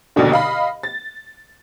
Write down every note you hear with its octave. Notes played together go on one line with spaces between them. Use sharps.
A#1 D#2 B2 D3
D#5 F5 B5
A6